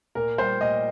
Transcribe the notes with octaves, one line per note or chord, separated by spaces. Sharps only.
A#2 A#4
G3 C5
A#2 D#5